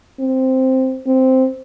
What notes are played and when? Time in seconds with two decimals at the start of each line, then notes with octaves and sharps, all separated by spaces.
0.20 C4
1.06 C4